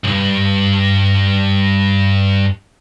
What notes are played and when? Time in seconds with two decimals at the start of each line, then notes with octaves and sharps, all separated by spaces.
0.04 B1 G2